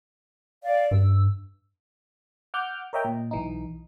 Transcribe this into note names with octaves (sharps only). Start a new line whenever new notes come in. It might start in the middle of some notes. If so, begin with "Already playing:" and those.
D5 F5
G2 E6
F#5 D6 F6 G6
A#4 C#5 D#5 E5 G5 A#5
A#2
B1 E3 D#4